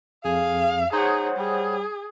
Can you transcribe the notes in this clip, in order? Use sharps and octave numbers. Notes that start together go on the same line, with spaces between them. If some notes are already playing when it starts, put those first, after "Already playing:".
F2 G#4 F5
D#4 G#4 C5 C#5 F#5
G3 G#4